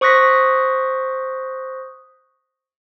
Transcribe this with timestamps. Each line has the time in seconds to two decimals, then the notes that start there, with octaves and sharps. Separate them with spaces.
0.01 C5 C#6 D#6 F#6 A#6 B6